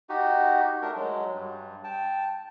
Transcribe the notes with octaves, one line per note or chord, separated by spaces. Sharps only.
D#4 F#4 G4
A3 D4 A#4
F#3 G#3
G2
G5 A5